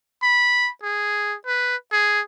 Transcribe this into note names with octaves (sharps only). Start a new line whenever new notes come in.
B5
G#4
B4
G#4